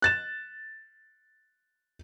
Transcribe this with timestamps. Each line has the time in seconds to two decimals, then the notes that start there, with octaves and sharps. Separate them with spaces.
0.02 F#6 A6 E7